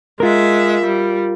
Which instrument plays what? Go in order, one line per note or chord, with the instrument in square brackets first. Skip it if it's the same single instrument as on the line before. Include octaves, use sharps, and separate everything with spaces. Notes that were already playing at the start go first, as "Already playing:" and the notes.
[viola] G#3 E5 [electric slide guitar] F4 A#4
[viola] G3